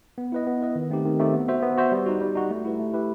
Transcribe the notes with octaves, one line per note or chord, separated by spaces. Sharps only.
B3
E4 B4 D#5
B3
E4 B4 D#5
D#3
A3 C4 D#4 G4
D#3
A3 C4 D#4 G4
B3
F#4 C5 E5
B3
F#4 C5 E5
G3
D#4 F#4
G3
D#4 F#4
A3
E4 G4 B4
A3
E4 G4 B4